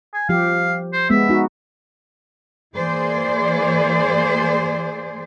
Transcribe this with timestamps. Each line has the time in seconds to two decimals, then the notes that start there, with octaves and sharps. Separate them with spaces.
0.14 G#5
0.29 F3 G4 F5
0.93 C5
1.10 G#3 B3 E5
1.29 D#4 F#4
2.76 E3 A#3 G#4 C5 D5